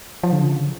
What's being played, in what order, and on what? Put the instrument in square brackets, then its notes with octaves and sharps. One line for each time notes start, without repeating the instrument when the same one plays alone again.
[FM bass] F3
D3
C#3